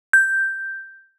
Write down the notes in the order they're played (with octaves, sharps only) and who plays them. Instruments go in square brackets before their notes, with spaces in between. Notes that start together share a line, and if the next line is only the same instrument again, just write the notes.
[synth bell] G6